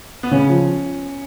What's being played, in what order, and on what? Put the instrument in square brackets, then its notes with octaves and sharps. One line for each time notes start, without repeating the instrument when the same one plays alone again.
[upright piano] B3
[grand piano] C#3 [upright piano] C#4
[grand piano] F3